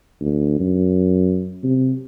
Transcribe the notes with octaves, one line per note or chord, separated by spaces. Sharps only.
D2
F#2
C3